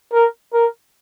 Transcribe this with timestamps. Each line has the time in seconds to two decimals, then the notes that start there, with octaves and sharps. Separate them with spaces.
0.13 A#4
0.54 A#4